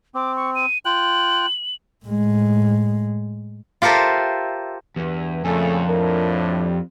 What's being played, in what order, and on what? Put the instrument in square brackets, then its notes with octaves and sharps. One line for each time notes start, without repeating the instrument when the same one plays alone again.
[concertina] C4 [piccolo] D6
[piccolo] C#6
D#7
[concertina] F4 G5 F#6 [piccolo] F#7
[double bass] A2 G#3
[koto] F4 G4 A4 A#4 C5 E5
[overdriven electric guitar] E2 [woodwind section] G2
[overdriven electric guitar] F2 [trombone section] A#2 C#3 A3 [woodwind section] A4 G#5
[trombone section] A2 F3 D4 [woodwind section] A#4
[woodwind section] G3